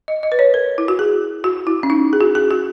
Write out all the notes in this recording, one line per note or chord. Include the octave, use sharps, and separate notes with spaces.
D#5
D#5
B4
C#5
A#4
E4
F#4
G#4
F#4
E4
C#4
D#4
G#4
F#4
G#4
F#4